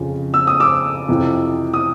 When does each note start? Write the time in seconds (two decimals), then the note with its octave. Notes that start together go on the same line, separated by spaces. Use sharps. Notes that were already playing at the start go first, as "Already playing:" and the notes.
Already playing: F2 C#3 F3
0.34 E6
0.47 D#6
0.60 D6 E6
1.08 F2 C3 E3
1.74 D#6